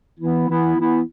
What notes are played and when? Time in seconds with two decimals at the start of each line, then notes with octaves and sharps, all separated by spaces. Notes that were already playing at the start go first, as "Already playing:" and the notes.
0.19 E3 B3 E4
0.48 E3 B3 E4
0.77 E3 B3 E4